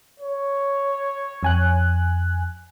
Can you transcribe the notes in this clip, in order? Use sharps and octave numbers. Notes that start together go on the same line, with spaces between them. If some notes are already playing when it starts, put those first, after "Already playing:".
C#5
F2 G#5 F#6